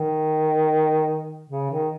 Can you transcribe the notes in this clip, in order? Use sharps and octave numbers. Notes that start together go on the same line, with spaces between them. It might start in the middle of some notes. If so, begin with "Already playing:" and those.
Already playing: D#3
C#3
D#3